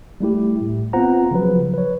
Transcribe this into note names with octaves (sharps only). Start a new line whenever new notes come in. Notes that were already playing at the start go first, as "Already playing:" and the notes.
G3 A3 E4 G4
A2
B3 C4 F4 C5 F#5 A#5
C#3 F3 F#3 B4
B4 C#5